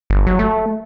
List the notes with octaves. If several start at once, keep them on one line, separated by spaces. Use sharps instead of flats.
G1
F#3
A3